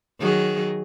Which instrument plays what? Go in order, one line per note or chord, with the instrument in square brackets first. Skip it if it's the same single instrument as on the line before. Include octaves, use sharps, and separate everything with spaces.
[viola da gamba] D#3 F#3 G#4